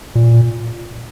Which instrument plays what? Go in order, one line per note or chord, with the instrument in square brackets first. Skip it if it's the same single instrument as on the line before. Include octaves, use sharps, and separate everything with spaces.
[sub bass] A#2